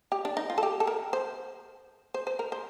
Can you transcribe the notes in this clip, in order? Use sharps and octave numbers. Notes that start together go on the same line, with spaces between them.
G4
D4
D#4
F4
A4
G4
A4
A#4
C5
C5
C5
A#4
C5